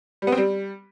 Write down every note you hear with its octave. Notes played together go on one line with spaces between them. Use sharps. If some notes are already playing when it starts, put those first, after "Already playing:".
G3
B3
C4
G3